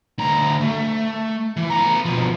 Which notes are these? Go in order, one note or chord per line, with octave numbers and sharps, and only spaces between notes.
D2 A#5
A3
E3
B3 A#5
B2 F3